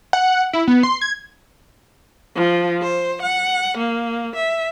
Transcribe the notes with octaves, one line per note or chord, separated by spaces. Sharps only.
F#5
E4
B3
C6
G#6
F3
C5
F#5
A#3
E5